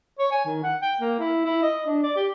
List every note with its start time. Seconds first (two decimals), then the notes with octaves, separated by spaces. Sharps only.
0.19 C#5
0.31 G#5
0.45 D#3
0.64 F#5
0.82 G5
1.00 A#3
1.19 E4
1.45 E4
1.62 D#5
1.86 D4
2.03 D5
2.16 G4